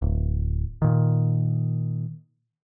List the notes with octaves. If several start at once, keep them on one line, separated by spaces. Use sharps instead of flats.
D1
A#2 D#3